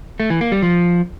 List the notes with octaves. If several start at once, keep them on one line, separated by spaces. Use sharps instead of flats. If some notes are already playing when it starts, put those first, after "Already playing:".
A3
E3
A#3
G3
F3